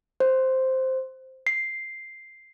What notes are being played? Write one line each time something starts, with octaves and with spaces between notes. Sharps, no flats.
C5
C7